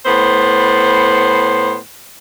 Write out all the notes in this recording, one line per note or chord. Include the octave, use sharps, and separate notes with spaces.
A2 B3 C5